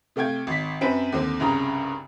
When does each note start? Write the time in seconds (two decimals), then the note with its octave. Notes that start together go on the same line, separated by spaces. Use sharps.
0.16 C3 A3 F5 G5 G#6
0.47 G#1 B6
0.81 F#2 C4 B4 D7
1.12 D#2 D3 C4
1.40 C2 G2 C#3 A#5